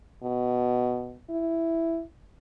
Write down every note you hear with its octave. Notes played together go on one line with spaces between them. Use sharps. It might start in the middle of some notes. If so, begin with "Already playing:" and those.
B2
E4